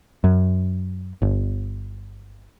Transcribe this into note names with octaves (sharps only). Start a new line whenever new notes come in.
F#2
G1